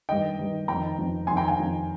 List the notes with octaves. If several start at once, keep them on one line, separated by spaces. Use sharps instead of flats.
G2 D#3 D#5 G5
G2 D#3
F2 D#3 G5 A#5
F2 D#3
F2 D#3 G#5 C6
G5 A#5
F5 G#5
F2 D#3